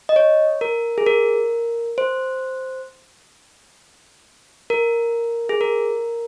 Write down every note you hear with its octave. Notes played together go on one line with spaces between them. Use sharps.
D#5
C#5
A#4
G#4
A#4
C5
A#4
G#4
A#4